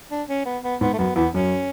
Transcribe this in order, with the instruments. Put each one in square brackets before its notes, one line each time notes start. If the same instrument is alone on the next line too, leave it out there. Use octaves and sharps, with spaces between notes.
[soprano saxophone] D4
C#4
B3
B3
[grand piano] G#2 [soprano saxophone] B3
[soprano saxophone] A3
[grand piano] F#2 [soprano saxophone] B3
[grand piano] E2 [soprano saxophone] B3
[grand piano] F#2 [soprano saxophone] C#4